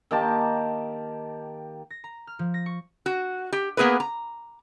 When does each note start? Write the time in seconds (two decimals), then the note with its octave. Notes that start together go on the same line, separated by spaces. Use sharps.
0.11 D#3 A#3 G4 A5
1.90 A#6
2.04 A#5
2.27 F6
2.39 F3
2.54 A#6
2.66 C#6
3.06 F#4
3.53 G4
3.77 A#3 B3 G#4 A#4 B4
4.00 A#5